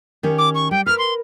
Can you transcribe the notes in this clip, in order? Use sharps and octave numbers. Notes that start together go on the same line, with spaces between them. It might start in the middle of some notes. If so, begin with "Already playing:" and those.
D#3 C#4 G4
D6
C#6
G3 G5
A#4 B4 F6
C6